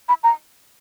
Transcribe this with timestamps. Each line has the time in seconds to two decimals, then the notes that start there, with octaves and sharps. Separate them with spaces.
0.09 B5
0.23 A#5